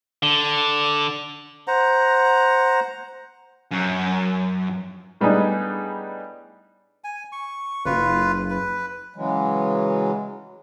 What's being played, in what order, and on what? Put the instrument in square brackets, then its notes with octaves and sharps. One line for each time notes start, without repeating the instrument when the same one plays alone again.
[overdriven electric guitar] D3
[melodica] C5 F#5 A#5
[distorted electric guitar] F#2
[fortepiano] A2 G3 B3 D4 D#4 G#4
[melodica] G#5
C#6
[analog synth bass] F#1 [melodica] F4 B4
[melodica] B4
[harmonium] C#3 E3 F#3 G#3